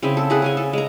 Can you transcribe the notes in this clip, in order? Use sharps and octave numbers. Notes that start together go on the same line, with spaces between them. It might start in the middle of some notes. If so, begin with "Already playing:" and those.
C#3 C4 E4 G#4
A4
E4 G#4 F#5
C#4 G#4 G#5
A4
G#3 A#5